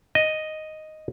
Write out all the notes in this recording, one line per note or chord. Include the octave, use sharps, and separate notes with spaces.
D#5